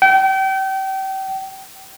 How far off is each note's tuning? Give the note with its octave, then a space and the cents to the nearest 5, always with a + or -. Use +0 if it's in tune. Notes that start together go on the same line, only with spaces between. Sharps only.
G5 -35